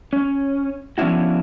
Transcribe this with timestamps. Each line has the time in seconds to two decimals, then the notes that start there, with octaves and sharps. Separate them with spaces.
0.13 C#4
0.98 F3 B3 C#4 D4 E4 F#4